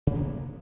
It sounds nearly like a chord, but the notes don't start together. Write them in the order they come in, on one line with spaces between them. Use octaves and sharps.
C3 A#3 B3